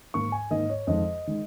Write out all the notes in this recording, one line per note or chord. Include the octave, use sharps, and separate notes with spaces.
G#2 D#3 A#3 C#6
G#5
G#2 D#3 A#3 D#5
C#5
F2 D#3 G#3 D#5
D#3 G#3